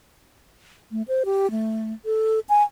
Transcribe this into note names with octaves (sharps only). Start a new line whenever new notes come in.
A3
C5
G4
A3
A4
G#5